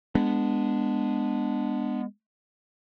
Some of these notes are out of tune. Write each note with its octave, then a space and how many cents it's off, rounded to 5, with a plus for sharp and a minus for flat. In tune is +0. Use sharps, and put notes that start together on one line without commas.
G#3 -15 B3 +0 D4 +0